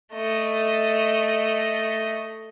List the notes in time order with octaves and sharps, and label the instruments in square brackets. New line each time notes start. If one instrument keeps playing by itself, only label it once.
[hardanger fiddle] A3 D#5